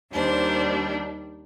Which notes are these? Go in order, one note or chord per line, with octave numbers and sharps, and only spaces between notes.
D#2 D#3 G3 D4 C5